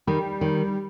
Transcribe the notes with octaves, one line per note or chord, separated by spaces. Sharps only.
D#3 G3
D#3